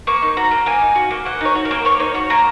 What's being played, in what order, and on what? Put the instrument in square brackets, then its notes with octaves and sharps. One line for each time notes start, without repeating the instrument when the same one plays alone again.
[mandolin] A#3 C#6
D#4
F#4 A#5
A#3
A#3 G#5
D#4
F#4
A#3
A#3 F#5
D#4 C#5
F#4
A#4
A#3
A#3 C#5
D#4 C#5
F#4 C#5
A#3 A#5